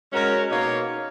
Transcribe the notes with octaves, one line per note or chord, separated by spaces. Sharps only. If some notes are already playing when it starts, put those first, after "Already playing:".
G#3 C#4 F#4 A#4 C#5
B2 A#3 D#4 A#4 C#5